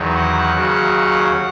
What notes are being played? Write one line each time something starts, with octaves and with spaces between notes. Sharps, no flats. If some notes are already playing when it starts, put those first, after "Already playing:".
Already playing: E2 D#3 F#3
F#5
D#2 C#3 F#3